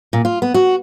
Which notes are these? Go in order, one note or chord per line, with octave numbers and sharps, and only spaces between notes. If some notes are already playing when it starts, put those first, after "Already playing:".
A#2
F4
B3
F#4